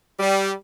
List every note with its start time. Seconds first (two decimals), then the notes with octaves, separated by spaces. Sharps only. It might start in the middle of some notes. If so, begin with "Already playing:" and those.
0.20 G3